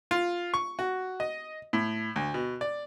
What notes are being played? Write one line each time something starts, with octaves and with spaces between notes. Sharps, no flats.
F4
C#6
F#4
D#5
A2
D2
B2
D5